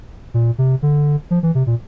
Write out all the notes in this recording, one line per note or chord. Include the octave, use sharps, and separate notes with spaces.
A#2
C3
D3
F3
E3
C3
A#2